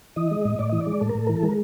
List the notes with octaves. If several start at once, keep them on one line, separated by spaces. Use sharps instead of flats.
E3 D#5
G#3
A2
A2 D5
E3 D#5
D5
G#3
A2 A4
A#4
A2 A4
E3 A#4
A4
G#3 A#4